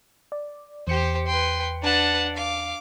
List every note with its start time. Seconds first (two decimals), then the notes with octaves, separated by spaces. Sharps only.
0.32 D5
0.87 E2 G4 C5 C#7
1.27 B4 G5 C6
1.83 D4 B4 F#5 A5
2.36 F5 D6